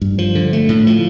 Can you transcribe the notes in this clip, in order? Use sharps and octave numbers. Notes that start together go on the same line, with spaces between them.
G2
F3
D3
A3
A2
F3